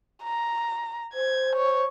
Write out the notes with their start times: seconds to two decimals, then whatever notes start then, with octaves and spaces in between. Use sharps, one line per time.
0.23 A#5
1.14 C5 G#6
1.56 C#5